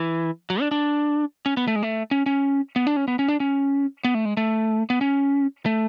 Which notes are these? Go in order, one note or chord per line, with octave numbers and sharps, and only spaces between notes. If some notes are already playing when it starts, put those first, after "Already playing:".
Already playing: E3
F#3
D4
D4
C#4
B3
A3
G#3
A3
C#4
C#4
B3
D4
C#4
B3
C#4
D4
C#4
B3
A3
G#3
A3
B3
C#4
A3